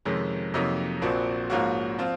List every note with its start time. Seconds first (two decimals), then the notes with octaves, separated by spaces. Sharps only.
0.05 F2 C3 D#3 G#3 C#4
0.54 F2 C3 F#3 A#3 D#4
1.02 A#1 A#2 F3 C4 F#4
1.50 G#2 F3 A#3 C#4 F#4
1.98 F3 C4 F4